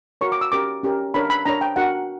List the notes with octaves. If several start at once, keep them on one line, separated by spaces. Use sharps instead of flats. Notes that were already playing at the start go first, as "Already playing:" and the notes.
F#4 A#4 C#5 C#6
D6
E6
C#4 G4 A#4 D6
C#4 G4 A#4
D4 A#4 C#5 B5
B5
D4 A#4 C#5 A#5
G5
D4 F#4 A#4 F#5